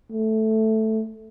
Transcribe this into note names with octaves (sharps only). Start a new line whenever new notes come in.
A3